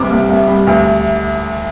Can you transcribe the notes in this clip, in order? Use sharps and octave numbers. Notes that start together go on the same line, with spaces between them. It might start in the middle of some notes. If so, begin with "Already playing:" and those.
Already playing: C2 C3 G3 D6
C2
C2
G3
D2